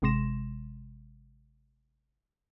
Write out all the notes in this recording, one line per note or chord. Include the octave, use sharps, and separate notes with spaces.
G#1 C3 G#3 C6 A#6 E7